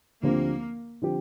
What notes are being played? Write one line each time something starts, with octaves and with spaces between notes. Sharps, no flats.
D2 D3 F3 A#3 C4 G4
D3 F3 C4 G4